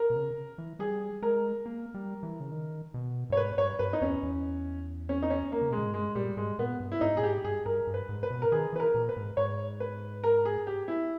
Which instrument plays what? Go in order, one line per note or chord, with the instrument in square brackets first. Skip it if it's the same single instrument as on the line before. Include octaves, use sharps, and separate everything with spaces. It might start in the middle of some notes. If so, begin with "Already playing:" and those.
Already playing: [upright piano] A#4
[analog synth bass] B2
C#3
E3
[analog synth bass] G3 [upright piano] G#4
[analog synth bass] G#3 [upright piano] A#4
[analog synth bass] A#3
G3
E3
C#3
D#3
B2
G2
[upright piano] C#5
[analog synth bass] G#2 [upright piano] B4
[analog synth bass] G2 [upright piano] C#5
[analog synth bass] G2 [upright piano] B4
[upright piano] D#4
[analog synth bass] E2 [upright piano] C#4
[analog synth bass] E2
[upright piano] C#4
D#4
C#4
A#3
[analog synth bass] C#3
[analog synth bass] B2 [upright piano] G#3
[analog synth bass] A#2
G#2
[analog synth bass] G2 [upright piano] G#3
[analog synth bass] A#2 [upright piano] G3
[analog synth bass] G#2 [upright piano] G#3
[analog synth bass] A#2 [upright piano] B3
[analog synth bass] G2
[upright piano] E4
[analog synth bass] G#2 [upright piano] D#4
[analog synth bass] A#2 [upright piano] G#4
[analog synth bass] G#2 [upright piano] G4
[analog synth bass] G2 [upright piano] G#4
[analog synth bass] G2 [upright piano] A#4
[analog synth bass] G2
[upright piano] B4
[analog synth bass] G#2
[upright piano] B4
[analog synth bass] B2
[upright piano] A#4
[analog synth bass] D#3 [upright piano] G#4
[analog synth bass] E3 [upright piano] B4
[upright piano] A#4
[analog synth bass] A#2
[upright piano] B4
[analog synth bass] G#2
[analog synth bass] G#2 [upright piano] C#5
[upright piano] B4
A#4
G#4
G4
E4